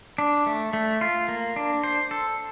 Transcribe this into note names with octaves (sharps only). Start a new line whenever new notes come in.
D4
A3
A3
F4
A#3
D4
C5
A4